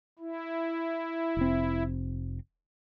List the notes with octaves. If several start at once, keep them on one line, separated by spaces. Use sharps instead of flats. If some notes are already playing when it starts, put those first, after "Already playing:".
E4
F1 C4